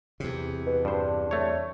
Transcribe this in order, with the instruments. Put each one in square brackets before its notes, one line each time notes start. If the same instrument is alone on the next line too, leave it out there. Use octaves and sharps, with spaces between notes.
[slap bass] E2 C3
[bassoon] B2
[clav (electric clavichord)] G2 C5 [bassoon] D4
[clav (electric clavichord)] A3 C#5